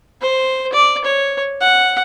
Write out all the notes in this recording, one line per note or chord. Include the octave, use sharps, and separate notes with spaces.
C5
D5
C#5
F#5